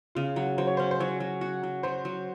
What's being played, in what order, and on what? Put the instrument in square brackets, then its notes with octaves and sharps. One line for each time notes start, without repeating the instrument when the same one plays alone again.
[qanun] C#3 [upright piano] F4
[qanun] F#3
[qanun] F#3 [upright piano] C5
[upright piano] C#5
[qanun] C#4 [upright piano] C5
[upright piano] C5
[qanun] F#3 [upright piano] C#5
[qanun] F#3
F#4
F#3
[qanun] F#3 [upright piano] C5
[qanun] F#3